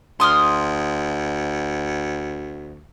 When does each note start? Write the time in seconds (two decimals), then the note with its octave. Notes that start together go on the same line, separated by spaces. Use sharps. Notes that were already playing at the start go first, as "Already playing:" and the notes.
0.20 D2 C6 D#6 F6